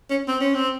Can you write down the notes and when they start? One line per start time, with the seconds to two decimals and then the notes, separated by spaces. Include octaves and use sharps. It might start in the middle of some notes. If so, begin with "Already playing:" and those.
0.10 C#4
0.28 C4
0.41 C#4
0.55 C4